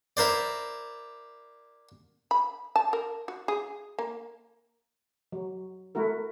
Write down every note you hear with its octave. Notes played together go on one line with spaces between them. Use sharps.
E4 A#4 C5 D5
B5
A5
A#4
F#4
G#4
A#3
F#3
A3 E4 F#4 A#4